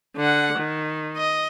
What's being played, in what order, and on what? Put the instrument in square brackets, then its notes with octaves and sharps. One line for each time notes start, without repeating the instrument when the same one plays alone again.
[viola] D3 F#5
D#3
D#5